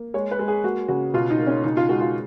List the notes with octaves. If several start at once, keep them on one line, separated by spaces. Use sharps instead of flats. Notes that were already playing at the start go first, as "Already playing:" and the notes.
Already playing: A#3
G#3 C#5
B4
G#3
G#4
A#3 F#4
C#3 F#4
B2 F4
D#4
A#3
C#4
C#3 D#4
F4
G#3 F#4
F4